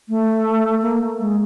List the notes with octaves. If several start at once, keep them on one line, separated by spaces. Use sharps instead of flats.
A3
A#3
G#3